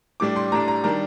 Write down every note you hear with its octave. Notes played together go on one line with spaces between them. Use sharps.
A2 G3 D4 D6
C6
A2 G3 D4 A#5
A#5
D#3 G3 D4 A#5